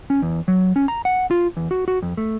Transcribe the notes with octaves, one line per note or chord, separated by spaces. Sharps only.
C#4
E2
F#3
C#4
A#5
F#5
F4
E2
F#4
F#4
F2
A3